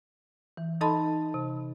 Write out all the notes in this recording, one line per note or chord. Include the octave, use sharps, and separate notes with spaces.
E3
D#4 A4 D#5 A5 B5 C6
C3